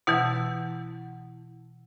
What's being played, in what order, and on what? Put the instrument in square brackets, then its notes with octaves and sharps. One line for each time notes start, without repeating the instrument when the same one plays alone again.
[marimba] B2 E3 [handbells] E4 F#5 E6